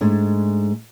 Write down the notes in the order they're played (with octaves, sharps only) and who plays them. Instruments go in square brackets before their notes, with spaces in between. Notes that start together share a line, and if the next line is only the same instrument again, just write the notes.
[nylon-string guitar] G#2 G#3 A3 D4